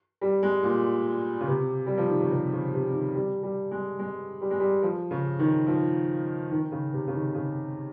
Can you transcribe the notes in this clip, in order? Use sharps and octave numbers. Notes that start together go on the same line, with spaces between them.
G3
G#3
A#2
C#3
C3
G3
F3
D#3
C#3
C3
C#3
C3
D#3
G3
G3
G#3
G#3
G3
G#3
G3
F3
C#3
D#3
F3
D#3
C#3
C3
C#3
D#3
C#3